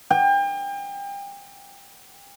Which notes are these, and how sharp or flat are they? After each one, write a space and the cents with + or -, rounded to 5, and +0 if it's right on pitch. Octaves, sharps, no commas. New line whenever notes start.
G5 +35